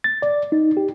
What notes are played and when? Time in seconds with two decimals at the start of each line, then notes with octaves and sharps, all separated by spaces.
0.04 A6
0.22 D5
0.52 D#4
0.77 G4